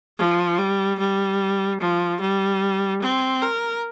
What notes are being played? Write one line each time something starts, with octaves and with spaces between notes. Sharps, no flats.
F3
G3
G3
F3
G3
C4
A#4